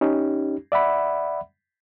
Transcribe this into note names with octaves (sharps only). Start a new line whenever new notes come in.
C#4 D#4 G4
D5 E5 F#5 B5